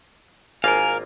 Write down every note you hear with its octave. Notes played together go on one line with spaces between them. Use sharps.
G#1 A#3 F4 A#4 F5 G#5